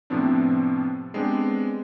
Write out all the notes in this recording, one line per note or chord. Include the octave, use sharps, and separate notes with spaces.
A2 C3 F3 B3 C4 D4
G#3 B3 C4 D4 G4